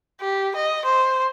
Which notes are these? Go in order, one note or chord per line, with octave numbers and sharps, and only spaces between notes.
G4
D#5
C5